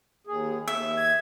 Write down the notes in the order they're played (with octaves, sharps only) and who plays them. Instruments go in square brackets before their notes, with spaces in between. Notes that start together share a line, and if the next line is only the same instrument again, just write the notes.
[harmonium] D#2 G#4
[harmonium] D#2 [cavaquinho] E5
[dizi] G#6